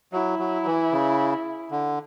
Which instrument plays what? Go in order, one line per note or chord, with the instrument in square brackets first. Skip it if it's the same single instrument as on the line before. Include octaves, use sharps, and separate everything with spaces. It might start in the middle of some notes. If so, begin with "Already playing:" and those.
[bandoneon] F#3 [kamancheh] E4
[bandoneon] F#3
E3
C#3
D3